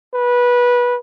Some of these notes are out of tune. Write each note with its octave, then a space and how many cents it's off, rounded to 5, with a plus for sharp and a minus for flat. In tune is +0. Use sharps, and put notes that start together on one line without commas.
B4 -20